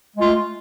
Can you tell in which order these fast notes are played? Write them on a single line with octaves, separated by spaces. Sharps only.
G#3 F4 A3